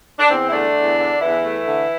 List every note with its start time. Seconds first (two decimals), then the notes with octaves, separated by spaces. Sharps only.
0.19 D4
0.30 E2 C4
0.48 E4
0.52 D3 A3 D4
0.76 E2
0.99 D3
1.21 E2 E3 E4
1.44 A3
1.66 D3